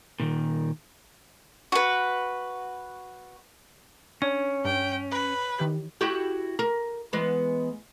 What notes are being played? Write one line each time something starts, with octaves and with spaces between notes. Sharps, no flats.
A#2 D#3
F#4 B4
C#4 D4 C#5
G2 G5
B4
D#3 E3 G4
E4 F#4 G4
A#4
E3 G#3 B3